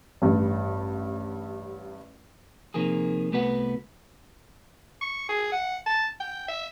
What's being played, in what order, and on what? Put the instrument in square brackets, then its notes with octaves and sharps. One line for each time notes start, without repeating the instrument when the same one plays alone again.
[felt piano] A1 G2
[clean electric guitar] C3 D#3 F3 A#3 G#4
C2 A3 B3 F#4 B4 F#5
[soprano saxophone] C#6
G#4
F#5
A5
G5
E5